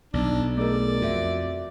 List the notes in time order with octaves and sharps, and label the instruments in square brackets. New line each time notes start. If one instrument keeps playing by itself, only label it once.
[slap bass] B1 [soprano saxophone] D4
[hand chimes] A3 G#4 A#4 [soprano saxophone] D5
[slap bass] F2 [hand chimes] F#4 E5